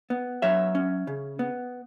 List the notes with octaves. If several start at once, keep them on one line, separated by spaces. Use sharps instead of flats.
B3
F#3 C#5 E5
C#4
C#3
B3